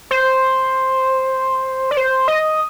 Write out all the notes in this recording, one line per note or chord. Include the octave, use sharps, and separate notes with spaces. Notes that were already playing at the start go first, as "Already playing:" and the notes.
C5
D5
C5
D#5